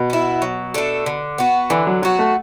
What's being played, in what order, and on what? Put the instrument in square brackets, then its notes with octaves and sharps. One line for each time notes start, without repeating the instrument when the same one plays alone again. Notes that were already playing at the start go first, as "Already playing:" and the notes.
Already playing: [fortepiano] B2
[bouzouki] B3 E4
F#3
A3 D4 A4
D3
B3 F#4
[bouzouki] D3 [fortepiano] E3
[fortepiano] F#3
[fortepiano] F#3 [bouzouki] B3 F#4
[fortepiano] A3